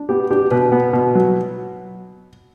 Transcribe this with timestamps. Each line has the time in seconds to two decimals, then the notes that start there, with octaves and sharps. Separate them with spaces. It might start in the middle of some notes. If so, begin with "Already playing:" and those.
Already playing: D4
0.09 B3 G4
0.31 D4 G4
0.51 B2 B4
0.72 B3
0.93 B2
1.15 F#3